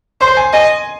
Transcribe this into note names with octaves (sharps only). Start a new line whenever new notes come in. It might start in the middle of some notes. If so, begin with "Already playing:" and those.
C5 C6
G#5
D#5 G#5